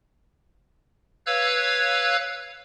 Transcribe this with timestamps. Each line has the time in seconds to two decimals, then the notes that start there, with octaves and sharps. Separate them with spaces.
1.26 B4 C#5 F5 E6 F#6 G#6